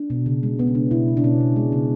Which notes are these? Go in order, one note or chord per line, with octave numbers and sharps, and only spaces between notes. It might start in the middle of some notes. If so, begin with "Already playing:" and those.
Already playing: D4
B2
C#3
G#3
G#3 B3
C#4
C#3 D4
B2 E4
B2
D4
B2 C#4
B2
G#3
C#3